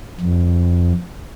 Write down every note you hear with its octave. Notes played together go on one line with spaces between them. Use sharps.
F2